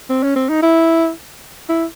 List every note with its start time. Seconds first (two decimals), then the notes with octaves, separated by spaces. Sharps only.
0.10 C4
0.23 C#4
0.36 C4
0.49 D#4
0.62 E4
1.69 E4